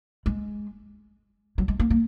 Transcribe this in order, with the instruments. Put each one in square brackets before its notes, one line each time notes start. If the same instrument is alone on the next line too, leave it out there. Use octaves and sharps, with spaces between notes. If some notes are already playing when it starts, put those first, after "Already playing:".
[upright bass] G#3
F#3
G#3
A#3
A#3